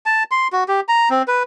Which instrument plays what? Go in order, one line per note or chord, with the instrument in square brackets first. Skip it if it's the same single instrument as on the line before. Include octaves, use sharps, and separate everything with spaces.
[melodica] A5
C6
F#4
G4
A#5
C4
B4